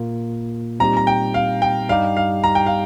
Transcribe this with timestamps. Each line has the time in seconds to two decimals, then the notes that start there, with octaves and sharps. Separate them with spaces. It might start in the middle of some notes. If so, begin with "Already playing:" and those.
Already playing: A#2 A#3 F4
0.80 A#2 G3 C4 D#4 G4 A#5
0.97 A#5
1.07 G5
1.34 F5
1.62 G5
1.89 G2 G3 D#4 G4 F5
2.17 F5
2.44 A#5
2.55 G5
2.66 F5